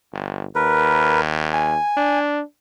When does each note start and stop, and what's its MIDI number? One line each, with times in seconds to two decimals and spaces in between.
0.13 0.45 31
0.55 1.77 39
0.55 1.20 70
0.55 1.20 71
1.53 2.19 80
1.97 2.41 62